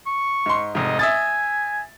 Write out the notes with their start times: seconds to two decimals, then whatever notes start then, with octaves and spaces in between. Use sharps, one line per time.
0.06 C#6
0.46 G#2 C6
0.75 F1 G#2 D#5
0.99 E5 G#5 D#6 A6